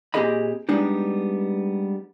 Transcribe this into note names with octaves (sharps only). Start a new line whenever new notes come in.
A#2 C4 G4 G#4 D#5 B5
G3 G#3 B3 D4 D#4